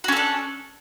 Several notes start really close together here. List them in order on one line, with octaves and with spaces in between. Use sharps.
F#4 C#4 A4 D4